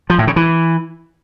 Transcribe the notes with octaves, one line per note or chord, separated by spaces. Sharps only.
F3
A2
C#3
E3